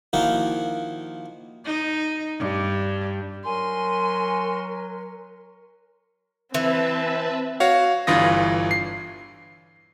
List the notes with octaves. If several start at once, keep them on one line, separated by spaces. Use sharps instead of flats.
D#3 F3 A#3 D#4 E4 F#4
D#4
G2
F#3 A#4 G#5 C6
E3 C4 B4 E5 A5
F#4 C#5 F5
G1 G2 E3 F4 D#6 A#6
C7